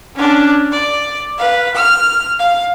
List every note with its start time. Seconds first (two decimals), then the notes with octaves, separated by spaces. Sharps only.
0.16 C#4 D4
0.72 D5
1.38 B4 F5
1.75 F6
2.39 F5